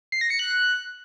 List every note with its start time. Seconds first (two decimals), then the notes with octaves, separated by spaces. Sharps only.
0.12 C7
0.21 A#6
0.30 C#7
0.39 F#6